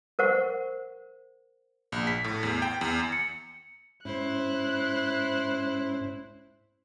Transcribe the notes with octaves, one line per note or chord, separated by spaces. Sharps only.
A#4 C5 F#5 C#6
A#1
B6
A2
E2
G5
E2
C#7
G#2 C#4 E4 C5 F#6